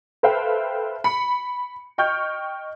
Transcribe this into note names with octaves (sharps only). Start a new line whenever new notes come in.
A4 B4 C5 E5 F5 G5
B5 C#7
D#5 G5 C#6 F6 G6